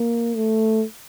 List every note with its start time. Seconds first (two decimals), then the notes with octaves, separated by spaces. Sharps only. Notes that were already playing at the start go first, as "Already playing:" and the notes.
Already playing: A#3
0.36 A3